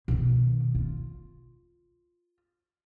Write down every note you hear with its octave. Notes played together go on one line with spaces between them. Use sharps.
B2 D#3
F4